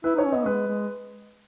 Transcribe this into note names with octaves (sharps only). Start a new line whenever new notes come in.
E4 B4
D#4 C#5
C#4
B3 D#5
G#3 B4
G#3